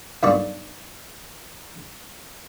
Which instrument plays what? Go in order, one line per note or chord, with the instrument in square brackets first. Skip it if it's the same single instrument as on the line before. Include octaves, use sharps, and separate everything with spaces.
[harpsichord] B1 G2 A#2 D5 C#6